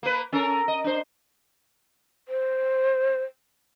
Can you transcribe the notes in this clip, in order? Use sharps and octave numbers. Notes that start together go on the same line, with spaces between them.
A#3 B4
C#4 A4 A#4
D#5
D4 C5
C5